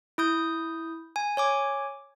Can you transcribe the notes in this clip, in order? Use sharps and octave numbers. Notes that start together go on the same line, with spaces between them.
E4 D#6 G6
G#5
C#5 G#5 D6